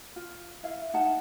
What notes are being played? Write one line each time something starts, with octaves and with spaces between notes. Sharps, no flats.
F4
E4 E5 F5
D#4 F#5 A5